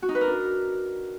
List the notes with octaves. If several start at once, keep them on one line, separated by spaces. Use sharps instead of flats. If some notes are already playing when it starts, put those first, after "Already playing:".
F#4
D#4
B4
A#4
D4